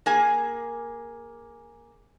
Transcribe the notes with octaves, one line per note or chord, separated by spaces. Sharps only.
A#3 G#4 G#5